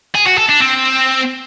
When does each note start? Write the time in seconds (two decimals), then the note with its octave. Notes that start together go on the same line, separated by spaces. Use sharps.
0.15 G#4
0.26 F#4
0.38 A4
0.49 D4
0.60 C4